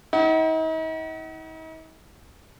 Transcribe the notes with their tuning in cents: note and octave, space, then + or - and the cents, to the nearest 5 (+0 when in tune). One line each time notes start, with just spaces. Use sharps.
D#4 +45 F#5 +30